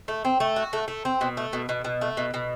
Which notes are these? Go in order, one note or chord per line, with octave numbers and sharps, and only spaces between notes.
A3
C4
A3
F#4
A3
A3
C4
B2
A3
B2
B2
B2
A3
B2
B2